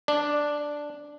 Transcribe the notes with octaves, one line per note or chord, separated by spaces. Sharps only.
D4